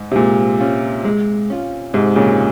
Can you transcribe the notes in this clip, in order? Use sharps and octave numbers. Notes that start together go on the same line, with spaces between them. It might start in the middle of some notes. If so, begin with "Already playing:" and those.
Already playing: G#2
C3
A#2 G#3
C#4 F4
G#3
C#4 F4
G#2 C3 G#3
A#2 C#3